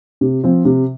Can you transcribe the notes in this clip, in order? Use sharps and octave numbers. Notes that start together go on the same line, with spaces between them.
C3
F3 C4
C3